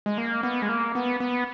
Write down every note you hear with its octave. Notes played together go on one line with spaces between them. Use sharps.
G#3
A#3
B3
G#3
A#3
B3
B3